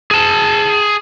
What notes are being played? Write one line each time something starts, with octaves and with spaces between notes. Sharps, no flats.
G#4 A5